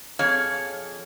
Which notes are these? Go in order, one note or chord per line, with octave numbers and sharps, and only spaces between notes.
F2 G#4 C#5 F5